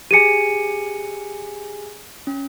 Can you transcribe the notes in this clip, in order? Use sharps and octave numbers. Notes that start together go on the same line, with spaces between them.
G4 G#4 G#5 C#7 D#7
C#4